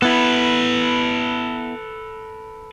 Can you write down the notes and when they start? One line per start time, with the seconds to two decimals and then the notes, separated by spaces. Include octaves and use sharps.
0.02 B3 E4 A4 B4